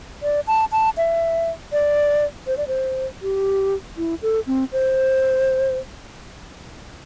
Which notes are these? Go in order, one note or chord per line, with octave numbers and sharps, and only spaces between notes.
D5
A5
A5
E5
D5
C5
D5
C5
G4
E4
A4
C4
C5